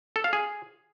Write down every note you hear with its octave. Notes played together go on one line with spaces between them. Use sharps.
A4
F5
G#4